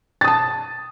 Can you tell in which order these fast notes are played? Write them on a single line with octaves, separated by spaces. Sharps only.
A6 D#6 A5